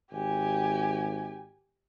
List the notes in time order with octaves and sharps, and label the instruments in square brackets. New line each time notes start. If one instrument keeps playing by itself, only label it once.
[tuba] G#1 [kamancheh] G4 G#5